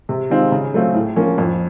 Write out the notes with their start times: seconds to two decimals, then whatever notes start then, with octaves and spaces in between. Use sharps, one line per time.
0.09 C3
0.30 D#3 G#3 C4 F4
0.52 C#3
0.74 F#3 A3 C4 F4
0.94 A2
1.16 F3 A#3 C#4
1.38 F2